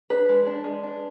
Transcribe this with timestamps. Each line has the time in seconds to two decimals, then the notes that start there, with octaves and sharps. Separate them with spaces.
0.10 D4 B4
0.29 G#3
0.47 D4
0.64 G#3
0.83 D4